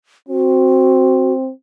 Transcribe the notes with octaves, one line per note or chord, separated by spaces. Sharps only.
C4 F#4